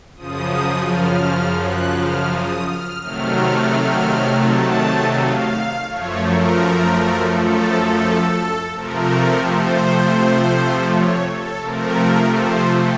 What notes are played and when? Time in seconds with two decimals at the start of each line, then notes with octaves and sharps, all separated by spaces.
0.16 F#2 C#3 F3 D#6
0.87 F6
1.59 F#6
1.95 F6
2.31 D#6
2.67 F6
3.02 C3 D#3 F#3 A3 F6
4.45 A5
5.17 F5
5.88 F#2 F3 A3 C#5
6.24 A#4
7.32 A4
8.74 C3 F3 A3 A#4
9.46 C5
10.89 C#5
11.25 A4
11.60 C3 F3 A3 A#4
12.33 C5